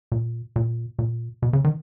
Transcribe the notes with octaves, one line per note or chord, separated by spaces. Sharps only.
A#2
A#2
A#2
B2
C#3
D#3